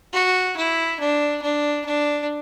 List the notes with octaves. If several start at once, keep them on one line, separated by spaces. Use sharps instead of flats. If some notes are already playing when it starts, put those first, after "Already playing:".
F#4
E4
D4
D4
D4